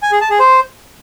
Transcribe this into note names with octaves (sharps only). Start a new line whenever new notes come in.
G#5
G#4
A5
G#4
C5